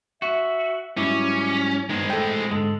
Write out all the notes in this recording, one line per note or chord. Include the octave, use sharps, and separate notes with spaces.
F#4 E5
G#2 F#3 G3 C#4 E4 D6
G2 D#3 G#3 B3 C4
A2 G#4 A4 G5
G#2 D3 G#3 A4